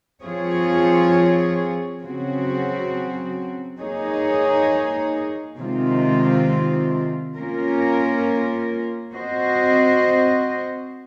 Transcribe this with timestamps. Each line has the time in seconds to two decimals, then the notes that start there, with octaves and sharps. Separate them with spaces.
0.22 F3 C4 F4 G#4 C#5
2.01 C#3 F#3 C4 F#4
3.79 A#3 D#4 G#4 C#5
5.57 C3 D#3 G#3 C4 F4
7.36 A#3 C#4 F4 A#4
9.14 C4 F#4 C5 D#5